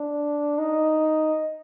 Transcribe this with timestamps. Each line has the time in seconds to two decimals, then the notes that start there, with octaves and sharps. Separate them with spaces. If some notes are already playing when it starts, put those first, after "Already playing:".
Already playing: D4
0.58 D#4